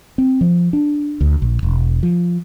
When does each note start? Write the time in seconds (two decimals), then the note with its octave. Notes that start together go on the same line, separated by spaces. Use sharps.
0.18 C4
0.41 F3
0.73 D4
1.21 D2
1.42 A#1
1.63 E1
2.03 F3